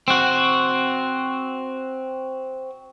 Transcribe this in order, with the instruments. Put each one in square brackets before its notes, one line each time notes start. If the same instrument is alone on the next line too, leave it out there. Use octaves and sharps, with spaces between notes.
[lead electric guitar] C4 F#4